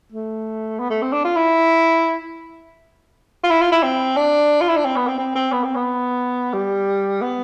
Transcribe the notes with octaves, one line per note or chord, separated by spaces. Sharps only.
A3
B3
A3
C4
D4
F4
E4
F4
E4
F4
E4
C4
D4
F4
E4
D4
C4
B3
C4
C4
C4
B3
C4
B3
G3
B3